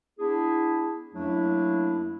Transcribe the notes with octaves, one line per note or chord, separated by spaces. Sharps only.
B3 D4 E4 G#4
F#2 F#3 A3 A#3 D4 E4